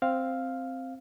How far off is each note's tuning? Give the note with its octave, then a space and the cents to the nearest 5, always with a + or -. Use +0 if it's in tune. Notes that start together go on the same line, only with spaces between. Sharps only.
C4 +0 F5 +0